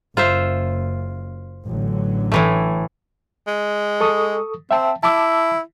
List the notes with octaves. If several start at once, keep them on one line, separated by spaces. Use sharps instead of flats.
F#1 F4 C5 E5
A1 D3 F#3
A2 E3 A3
G#3
A4 C#6 D#6
C4 E5 G5 A5
E4 A5 D6 E6